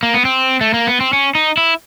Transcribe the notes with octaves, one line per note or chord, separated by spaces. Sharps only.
A#3
B3
C4
A3
A#3
B3
C4
C#4
D#4
E4